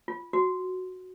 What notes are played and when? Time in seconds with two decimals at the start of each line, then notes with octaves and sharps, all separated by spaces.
0.08 F4
0.33 F#4